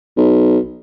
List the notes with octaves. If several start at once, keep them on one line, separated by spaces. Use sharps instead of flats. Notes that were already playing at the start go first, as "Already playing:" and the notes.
B1